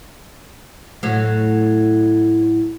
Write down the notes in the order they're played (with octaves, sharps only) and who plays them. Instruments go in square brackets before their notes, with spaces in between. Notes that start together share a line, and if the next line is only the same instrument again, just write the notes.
[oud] A2 F#3